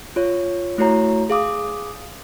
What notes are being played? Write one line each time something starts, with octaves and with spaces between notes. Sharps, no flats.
F4 C#5
A3 E4 F#4 C#5 A#5
G#4 F5 D6 D#6